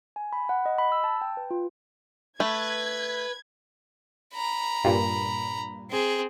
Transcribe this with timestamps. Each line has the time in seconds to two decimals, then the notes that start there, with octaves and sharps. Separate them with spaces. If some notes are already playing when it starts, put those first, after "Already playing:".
0.16 G#5
0.33 B5
0.49 F#5
0.66 D#5
0.78 B5
0.92 E6
1.04 A5
1.21 G5
1.37 B4
1.51 F4
2.40 A3 B4 G#6
4.34 A#5 B5
4.84 G2 A#2
5.91 C4 G#4